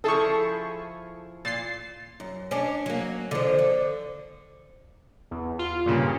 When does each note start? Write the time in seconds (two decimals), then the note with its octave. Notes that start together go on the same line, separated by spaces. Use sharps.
0.04 F3 E4 G#4 A4 C#6
1.45 A#2 A6 C7
2.20 F#2
2.51 C#4 D4
2.86 F#3 A#3
3.31 D3 F3
3.59 D3
5.31 E2
5.59 F4
5.86 G2 A#2 C#3